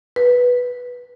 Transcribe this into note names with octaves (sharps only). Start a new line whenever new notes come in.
B4